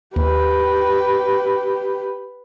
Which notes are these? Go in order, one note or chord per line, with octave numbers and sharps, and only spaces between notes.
D#2 G4 B4